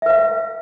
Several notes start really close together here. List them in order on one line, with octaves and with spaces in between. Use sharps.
E5 B4 F5